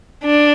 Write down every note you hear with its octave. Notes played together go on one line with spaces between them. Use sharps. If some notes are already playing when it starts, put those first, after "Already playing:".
D4